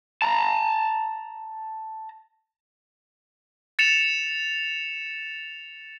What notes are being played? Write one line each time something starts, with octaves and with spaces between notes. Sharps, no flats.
A5 A#5
A6 C#7 E7 F7